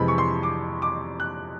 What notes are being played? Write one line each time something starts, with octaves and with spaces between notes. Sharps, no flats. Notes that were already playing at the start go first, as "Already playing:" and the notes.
Already playing: F2 C3 E3 G#3 B5
C#6
C6
D6
D6
F#6